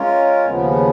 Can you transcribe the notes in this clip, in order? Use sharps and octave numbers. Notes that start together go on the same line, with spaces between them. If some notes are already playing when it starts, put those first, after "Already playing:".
Already playing: G#3 C#4 F4 A#4
D#2 C#3 F3 B3